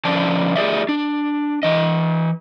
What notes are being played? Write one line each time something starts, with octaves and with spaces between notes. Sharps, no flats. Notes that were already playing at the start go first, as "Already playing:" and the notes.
D3 F3 C#4 D5 A5
G4 G#4 D5 E5
D4
E3 D#5